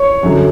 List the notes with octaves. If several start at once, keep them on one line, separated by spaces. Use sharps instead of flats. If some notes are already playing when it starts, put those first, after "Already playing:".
Already playing: C#5
F#2 D3 F#3